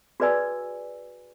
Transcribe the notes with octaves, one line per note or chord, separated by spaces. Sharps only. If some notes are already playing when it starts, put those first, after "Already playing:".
F#4 G#4 B4 D5 G#5 E6